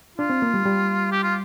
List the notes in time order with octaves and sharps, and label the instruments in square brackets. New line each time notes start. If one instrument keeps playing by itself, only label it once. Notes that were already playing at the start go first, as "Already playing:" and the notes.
[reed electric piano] D4 [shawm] F4
[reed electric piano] C4
A#3
G3
G3
[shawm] G4
F4